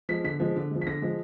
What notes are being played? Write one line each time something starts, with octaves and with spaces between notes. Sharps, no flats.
F3 G#3 B6
D3 B6
F3 G#3
D3
F3 G#3
B6
D3 A#6
F3 G#3